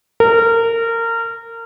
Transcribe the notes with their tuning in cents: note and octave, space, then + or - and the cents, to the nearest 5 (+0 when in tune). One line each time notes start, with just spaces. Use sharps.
A#4 -25